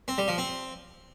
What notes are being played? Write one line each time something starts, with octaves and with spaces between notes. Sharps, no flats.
C4
G3
F3
C4